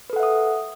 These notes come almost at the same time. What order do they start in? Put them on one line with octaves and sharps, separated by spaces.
B4 A4 F#5 E5 D#6